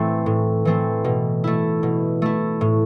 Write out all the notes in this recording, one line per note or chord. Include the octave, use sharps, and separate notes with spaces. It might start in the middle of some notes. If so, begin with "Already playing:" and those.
Already playing: A2 E3 A3 C4
A2
E3 A3 C4
B2
A3 E4
B2
A3 E4
A2